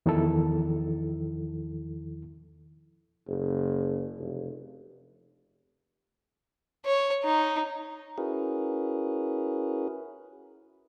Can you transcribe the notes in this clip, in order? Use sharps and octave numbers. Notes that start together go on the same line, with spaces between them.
E2 D#3 F3 E4 A4
F#1
F1
C#5
D#4
C#4 E4 F#4 G#4 A#4 B4